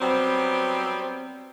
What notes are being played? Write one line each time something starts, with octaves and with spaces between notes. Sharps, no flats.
F#3 G3 B3 C4